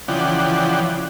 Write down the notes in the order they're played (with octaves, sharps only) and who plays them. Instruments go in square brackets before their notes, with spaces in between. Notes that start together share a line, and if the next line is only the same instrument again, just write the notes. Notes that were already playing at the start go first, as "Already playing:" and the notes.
[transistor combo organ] C#3 E3 F3 D5 F#5 G5